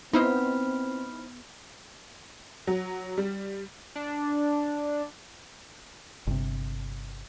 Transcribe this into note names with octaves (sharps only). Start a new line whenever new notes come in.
B3 C4 D#4 E4 C5 B5 F6
F#3
G3
D4
G1 C3